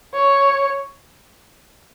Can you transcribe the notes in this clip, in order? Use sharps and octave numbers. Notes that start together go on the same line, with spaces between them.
C#5